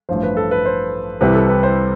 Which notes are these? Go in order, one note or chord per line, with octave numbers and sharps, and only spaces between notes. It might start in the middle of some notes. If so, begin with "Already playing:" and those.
A1 G2 F3 C5
B4
A4
B4
C5
C2 C3 E3 G3 B4
A4
B4
C5